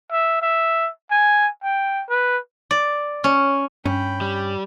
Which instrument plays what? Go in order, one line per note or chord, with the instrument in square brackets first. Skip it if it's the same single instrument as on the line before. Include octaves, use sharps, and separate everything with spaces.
[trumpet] E5
E5
G#5
G5
B4
[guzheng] D5
C#4
[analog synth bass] G2 [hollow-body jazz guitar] C#4 [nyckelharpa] G5 B5
[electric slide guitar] G3